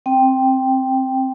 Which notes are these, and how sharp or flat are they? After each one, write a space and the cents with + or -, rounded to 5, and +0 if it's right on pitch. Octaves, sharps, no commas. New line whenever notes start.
C4 +10 G5 +0